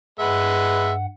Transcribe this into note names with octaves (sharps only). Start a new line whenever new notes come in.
G2 G#3 B4 E5 F#5